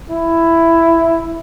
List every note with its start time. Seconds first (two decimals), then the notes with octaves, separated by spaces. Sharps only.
0.10 E4